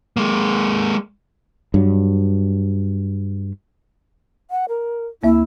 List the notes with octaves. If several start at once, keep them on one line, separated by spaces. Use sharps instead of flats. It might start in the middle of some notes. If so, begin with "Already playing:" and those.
G#3 A#3
G2 F#3
F#5
A#4
D2 A#3 E4 E5